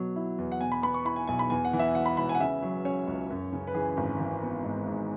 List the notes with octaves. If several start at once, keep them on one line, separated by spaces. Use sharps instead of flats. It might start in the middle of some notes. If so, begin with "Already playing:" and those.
Already playing: B2 F#3
E4
E2
F#5
B2 G#5
B5
B3 B5
C#6
E4 B5
G#5
B1 G#5
B5
E2 G#5
F#5
E3
E5
E1 F#5
B5
E1 B5
G#5
F#5
C#3 E5
F#3
C#4 C#5
C#2
F#2
C#3
B4
E3 G#4
G#1
E3
B3
G#2
G#2